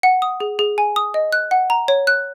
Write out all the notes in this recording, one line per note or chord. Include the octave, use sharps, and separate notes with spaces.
F#5
D#6
G#4
G#4
G#5
D#6
D#5
F#6
F#5
A#5
C#5
F#6